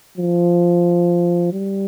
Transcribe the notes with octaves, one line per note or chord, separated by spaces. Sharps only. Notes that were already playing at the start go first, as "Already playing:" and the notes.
F3
G3